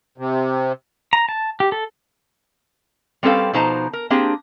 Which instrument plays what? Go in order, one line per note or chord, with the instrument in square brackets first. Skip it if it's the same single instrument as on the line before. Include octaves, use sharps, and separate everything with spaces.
[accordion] C3
[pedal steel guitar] A#5
A5
G4
A4
[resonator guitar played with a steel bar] G3 C4 C#4 A4 B4 F5
B2 F3 D#4 C5 A5 A#5
A#4
A#3 C4 D4 G4 G#4